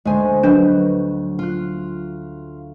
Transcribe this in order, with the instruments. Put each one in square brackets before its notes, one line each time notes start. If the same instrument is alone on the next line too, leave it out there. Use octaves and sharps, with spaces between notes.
[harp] D2 C5 [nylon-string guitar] G#3 G#5
[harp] F#3 G6 [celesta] D4 [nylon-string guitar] B4 D#5
[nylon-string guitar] F4 [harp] F6 F#6